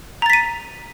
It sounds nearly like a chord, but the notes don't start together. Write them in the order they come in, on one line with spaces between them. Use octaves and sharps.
A#5 A6 B6 D#7